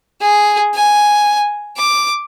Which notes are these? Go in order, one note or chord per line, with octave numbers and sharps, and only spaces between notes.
G#4
G#5
D6